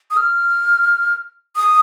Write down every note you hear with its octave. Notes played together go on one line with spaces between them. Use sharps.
D#6
F6
D#6